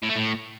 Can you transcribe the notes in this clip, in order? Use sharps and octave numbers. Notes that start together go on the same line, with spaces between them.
A2
A3
A2